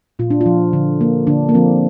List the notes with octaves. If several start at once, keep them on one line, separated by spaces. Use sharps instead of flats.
A#2 F4
D4
F4
F3
D3
A#3
D3 D4
A#3
F3 C4